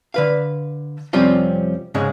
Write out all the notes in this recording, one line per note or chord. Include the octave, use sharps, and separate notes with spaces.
D3 B4 F5
F2 C3 G3 C4 C#4 F4
G#2 C#3 G#3